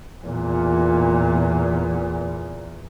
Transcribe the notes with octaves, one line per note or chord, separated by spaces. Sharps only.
E2 A#2